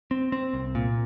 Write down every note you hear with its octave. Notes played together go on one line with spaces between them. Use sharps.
C4
C4
C2
A#2